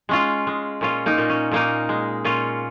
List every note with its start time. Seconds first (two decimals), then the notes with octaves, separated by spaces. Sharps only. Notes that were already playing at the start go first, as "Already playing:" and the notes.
0.09 G#3 C#4 F4
0.47 G#3
0.81 A#2 C#4 F4
1.06 A#3 D#4
1.18 A#2
1.30 C#4
1.51 A#2 A#3 D#4
1.89 G#3
2.24 A#2 C#4 F4